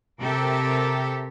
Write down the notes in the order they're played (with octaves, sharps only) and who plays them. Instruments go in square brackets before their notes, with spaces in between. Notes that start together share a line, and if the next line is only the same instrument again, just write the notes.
[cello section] C3 G4 A4 A#4 E5